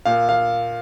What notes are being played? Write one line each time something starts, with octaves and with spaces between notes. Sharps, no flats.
A#2 F5
F5